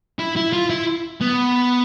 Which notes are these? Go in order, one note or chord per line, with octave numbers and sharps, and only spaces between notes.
E4
E4
F4
E4
B3